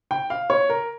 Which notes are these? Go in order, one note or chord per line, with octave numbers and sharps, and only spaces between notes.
G5
F5
C#5
A#4